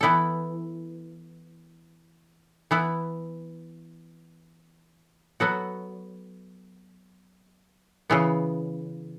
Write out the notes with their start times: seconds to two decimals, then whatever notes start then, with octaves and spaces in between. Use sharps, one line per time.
0.01 E3 B3 E4 A4
2.71 E3 B3 E4
5.40 F#3 B3 F#4 A4
8.10 C#3 E3 B3